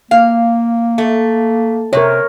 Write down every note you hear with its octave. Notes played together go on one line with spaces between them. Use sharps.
A#3 F5
A3
C3 A#4 C#5